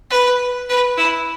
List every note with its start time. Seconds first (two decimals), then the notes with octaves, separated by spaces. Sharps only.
0.11 B4
0.70 B4
0.97 E4